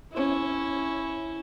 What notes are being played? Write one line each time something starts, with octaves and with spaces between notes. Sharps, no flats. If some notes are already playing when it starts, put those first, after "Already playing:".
C#4 E4